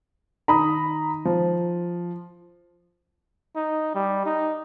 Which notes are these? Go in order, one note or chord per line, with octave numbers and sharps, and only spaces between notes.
D#3 A#5 B5 D#6
F3
D#4
G3
D#4